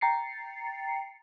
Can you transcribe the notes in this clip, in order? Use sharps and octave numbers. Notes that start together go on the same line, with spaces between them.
G5 A#5 A6 C7 C#7